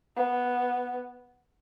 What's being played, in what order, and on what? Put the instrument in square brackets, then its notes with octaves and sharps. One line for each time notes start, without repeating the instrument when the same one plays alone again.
[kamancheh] B3